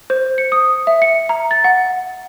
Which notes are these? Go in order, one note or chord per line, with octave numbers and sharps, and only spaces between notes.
C5
C#7
D#6
E5
C#7
A#5
A6
F#5